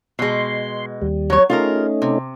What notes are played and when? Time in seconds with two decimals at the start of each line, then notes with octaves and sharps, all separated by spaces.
0.19 B2 G#3 C6
1.02 D#2 G3
1.30 F#3 C#5
1.50 A3 C#4 D#4 F4 G#4 A#4
2.02 C3